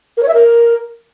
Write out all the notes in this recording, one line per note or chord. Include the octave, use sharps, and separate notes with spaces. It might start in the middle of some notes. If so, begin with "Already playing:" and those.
A#4
C#5
E5
A#4